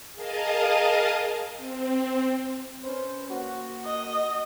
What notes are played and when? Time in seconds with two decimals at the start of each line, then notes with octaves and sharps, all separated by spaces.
0.13 G#4 A#4 D#5 F5 A5 D#6
1.56 C4
2.84 C#4 B4 C5
3.29 A#3 F#4
3.86 D#5